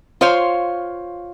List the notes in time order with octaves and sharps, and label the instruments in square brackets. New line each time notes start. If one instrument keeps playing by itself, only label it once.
[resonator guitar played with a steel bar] F4 C5 C#5 F5